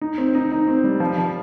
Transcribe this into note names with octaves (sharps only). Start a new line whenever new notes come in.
D#4
C4
D#4
D#4
C4
G3
F3
F3